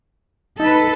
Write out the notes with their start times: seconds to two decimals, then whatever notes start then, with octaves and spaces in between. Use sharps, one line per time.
0.60 D#4 A4 B4